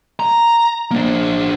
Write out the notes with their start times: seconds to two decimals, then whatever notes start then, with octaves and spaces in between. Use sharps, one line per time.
0.20 A#5
0.91 A#3 D4